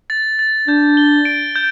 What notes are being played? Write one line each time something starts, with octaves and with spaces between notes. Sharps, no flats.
A6
A6
D4 G6
G7
D7
G6